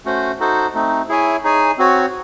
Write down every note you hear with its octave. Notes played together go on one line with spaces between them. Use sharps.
A3 C#4 F#4 C5
D#4 F#4 A4 C5
A3 C4 D#4
E4 G#4 C#5 E5 G#5
D#4 G#4 C#5 G#5
C4 F#4 C#5